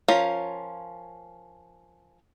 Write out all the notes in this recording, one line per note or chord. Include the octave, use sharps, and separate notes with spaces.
F3 C#4 F4 A#4 F5